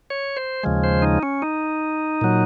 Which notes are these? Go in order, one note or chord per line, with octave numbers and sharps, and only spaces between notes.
C#5
C5
D#2 C#3 F3 G#3
C5
D#4
C#4
D#4
A#2 F#3